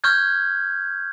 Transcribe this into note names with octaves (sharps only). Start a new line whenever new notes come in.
C#6 F6 G6 G#6